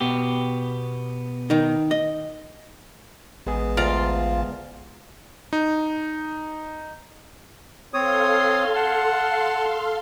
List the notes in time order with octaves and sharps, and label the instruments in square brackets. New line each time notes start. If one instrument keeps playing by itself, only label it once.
[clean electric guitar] B2 B3 G4
[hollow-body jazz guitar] D#3 D#4
D#5
[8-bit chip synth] A1 [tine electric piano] G#3 B3 G#4
[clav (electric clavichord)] D2 D5 A#5 [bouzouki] F4
[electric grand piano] D#4
[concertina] C4 C#5 D#6 [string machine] A4 F5 C6
[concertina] F#5 A5